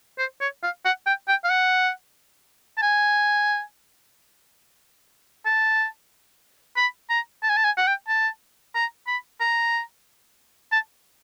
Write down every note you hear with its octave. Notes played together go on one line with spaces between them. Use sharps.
C5
C#5
F5
F#5
G5
G5
F5
F#5
A5
G#5
A5
B5
A#5
A5
G#5
A5
G#5
F#5
G5
A5
A#5
B5
A#5
A5